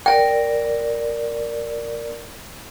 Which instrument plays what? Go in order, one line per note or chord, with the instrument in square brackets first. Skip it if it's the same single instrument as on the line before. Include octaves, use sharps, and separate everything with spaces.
[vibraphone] A#4 D5 [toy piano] G5